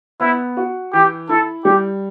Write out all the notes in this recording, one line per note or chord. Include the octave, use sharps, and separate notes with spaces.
B3 E4
F#4
E3 G4
E4 A4
G3 G4